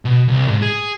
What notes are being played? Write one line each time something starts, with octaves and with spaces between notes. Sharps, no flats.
B2
C2
G#2
G#4